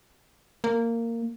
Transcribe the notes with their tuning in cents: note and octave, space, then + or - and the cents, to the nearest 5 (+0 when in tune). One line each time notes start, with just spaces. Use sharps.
A#3 -15